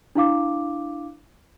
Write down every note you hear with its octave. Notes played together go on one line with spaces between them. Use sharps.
D4 E4 F5 D6